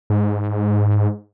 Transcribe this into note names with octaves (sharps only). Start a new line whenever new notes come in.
G#2